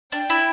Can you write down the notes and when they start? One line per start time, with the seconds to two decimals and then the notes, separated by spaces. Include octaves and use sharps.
0.12 D4 G5
0.30 E4